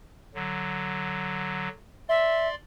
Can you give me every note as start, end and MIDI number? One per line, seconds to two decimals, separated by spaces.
0.35 1.69 50
0.35 1.69 54
2.09 2.55 74
2.09 2.48 76
2.09 2.55 84